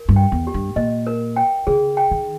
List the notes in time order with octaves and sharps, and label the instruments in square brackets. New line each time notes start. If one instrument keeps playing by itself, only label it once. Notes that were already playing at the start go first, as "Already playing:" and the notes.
Already playing: [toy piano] A#4
[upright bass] G2
[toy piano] G5
[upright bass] E2
[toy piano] G4
[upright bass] G2
[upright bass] A#2 [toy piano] D#5
[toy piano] A#4
G5
[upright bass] C#3 [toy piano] G#4
[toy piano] G5
[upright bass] D#3